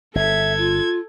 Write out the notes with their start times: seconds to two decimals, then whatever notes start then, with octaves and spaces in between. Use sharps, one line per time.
0.15 G1 A4 E5 G#6
0.57 F4